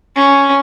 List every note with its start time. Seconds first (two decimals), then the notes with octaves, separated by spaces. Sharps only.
0.16 C#4